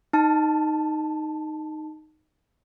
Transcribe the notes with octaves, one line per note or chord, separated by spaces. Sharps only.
D#4 A5